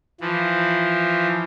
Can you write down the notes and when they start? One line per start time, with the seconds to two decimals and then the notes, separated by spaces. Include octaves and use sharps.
0.21 E3 F3